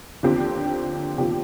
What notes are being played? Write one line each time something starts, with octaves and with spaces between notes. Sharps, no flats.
D#2 D3 F3 C4 G4
D#2 D3 F3 C4 G4